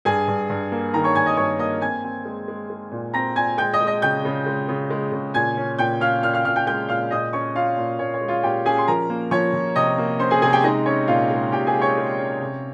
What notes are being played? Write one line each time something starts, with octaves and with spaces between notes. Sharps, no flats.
G2 G#4 G#5
G2
G2
A#3
D#3 A#4 A#5
C#5 C#6
G2 G#5 G#6
D#5 D#6
G2 C#5 C#6
A#3 D#5 D#6
C4 G#5 G#6
C4
G#3
G#3
G#3
A#2
C4 A#5 A#6
A#2 G#5 G#6
G#3 G5 G6
D#5 D#6
G#3
D#5 D#6
C#3 G5 G6
C#3
G#3
C#3
G#3
C#3
A#2 G#5 G#6
C#4
A#2 G5 G6
C#4 F5 F6
A#2 F5 F6
F5 F6
A#2 F5 F6
G5 G6
G#3 G5 G6
A#2 F5 F6
A#2 D#5 D#6
C#4 C#5 C#6
C#4 F4 F5
A#2
A#2 C#5
C#5
G#3
F4 F5
A#2 G4 G5
C#4 G#4 G#5
C6
F3 A#4 A#5
A#3
F3 C#5 C#6
F3
C3 D#5 D#6
A#3
C#4 C5 C6
G#4 G#5
C3 G#4 G#5
G4 G5
G#3 D#4 D#5
C#4 C#5
A#2 F4 F5
G#3
A#2 G4 G5
G#4 G#5
G#3
C#5 C#6
G#3
C#4
C3